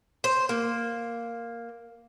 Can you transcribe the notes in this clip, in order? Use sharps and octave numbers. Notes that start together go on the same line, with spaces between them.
C5
A#3